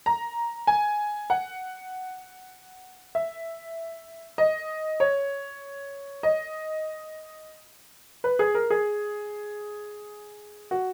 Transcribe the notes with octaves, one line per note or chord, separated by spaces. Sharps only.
A#5
G#5
F#5
E5
D#5
C#5
D#5
B4
G#4
A#4
G#4
F#4